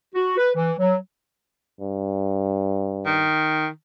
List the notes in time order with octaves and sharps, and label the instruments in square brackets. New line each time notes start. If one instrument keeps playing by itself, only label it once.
[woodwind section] F#4
B4
E3
F#3
[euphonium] G2
[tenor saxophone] D#3